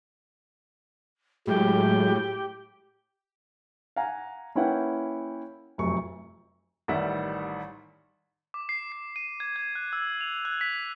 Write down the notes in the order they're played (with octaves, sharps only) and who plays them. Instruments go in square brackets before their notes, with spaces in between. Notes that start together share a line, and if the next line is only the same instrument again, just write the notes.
[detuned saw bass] A2 [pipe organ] F#3 G#3 [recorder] G4
[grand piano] F5 F#5 G#5 A#5
A#3 C#4 E4 B4 F#5 G5
F1 F#2 C#6
[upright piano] A1 D#3 G3 E5 F#5
[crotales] D6
C7
C7
D#7
G#6
G#6
F#6
E6
F7
F#6
B6